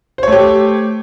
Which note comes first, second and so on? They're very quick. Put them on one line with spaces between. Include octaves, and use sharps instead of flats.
C5 C#5 A3 G4